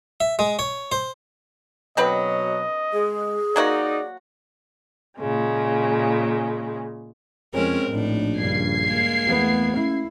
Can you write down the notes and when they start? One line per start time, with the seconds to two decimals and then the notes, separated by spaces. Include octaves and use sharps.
0.20 E5
0.39 G#3
0.59 C#5
0.92 C5
1.97 B2 D3 F#3 C4 B4 D#5
2.93 G#3 G#4
3.56 F#3 A#3 D#4 F#4 D5
5.19 A#2 C#3 G#3
7.54 F2 G#3 C4 C#4 A#4
7.90 A#1 A2 D4 D#4
8.39 G2 C#3 G#6 C7
8.82 G#3 A#3
9.27 E2 A3 B3
9.77 C#4 E4